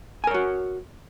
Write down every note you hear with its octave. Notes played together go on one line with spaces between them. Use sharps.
F#4 A#4 C#5 G#5